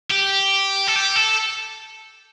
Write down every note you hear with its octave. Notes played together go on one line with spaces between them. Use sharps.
G4
A4
G4
A4